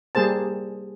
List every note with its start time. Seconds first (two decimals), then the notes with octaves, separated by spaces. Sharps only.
0.15 G3 A#3 G#4 C5 A5